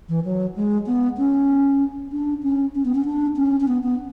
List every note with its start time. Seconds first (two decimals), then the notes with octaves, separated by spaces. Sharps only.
0.09 E3
0.24 F#3
0.56 G#3
0.87 B3
1.18 C#4
2.12 D4
2.43 C#4
2.75 C#4
2.85 B3
2.95 C#4
3.05 D4
3.37 C#4
3.60 C#4
3.68 B3
3.83 B3